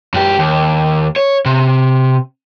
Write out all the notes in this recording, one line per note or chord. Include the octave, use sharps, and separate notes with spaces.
F#2 G4
D#2
C#5
C3